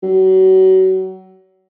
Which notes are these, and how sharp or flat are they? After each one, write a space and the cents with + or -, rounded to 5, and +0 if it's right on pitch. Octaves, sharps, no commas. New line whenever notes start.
F#3 +30